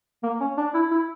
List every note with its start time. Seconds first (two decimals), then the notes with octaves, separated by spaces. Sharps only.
0.23 A#3
0.41 C#4
0.57 D4
0.74 E4
0.91 E4